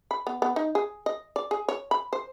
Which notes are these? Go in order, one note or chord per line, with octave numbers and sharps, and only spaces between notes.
B5
B3
B3
D#4
G#4
D#5
D5
G#4
C#5
B5
C5